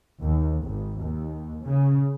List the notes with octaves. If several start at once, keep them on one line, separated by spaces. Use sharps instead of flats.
D#2
G#1
D#2
C#3